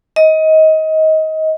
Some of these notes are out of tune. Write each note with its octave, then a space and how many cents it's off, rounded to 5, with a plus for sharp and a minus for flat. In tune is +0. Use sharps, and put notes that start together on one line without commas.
D#5 +20